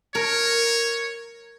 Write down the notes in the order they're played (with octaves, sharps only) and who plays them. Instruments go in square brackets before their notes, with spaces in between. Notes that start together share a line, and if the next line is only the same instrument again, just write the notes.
[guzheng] A#4 [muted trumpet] C#5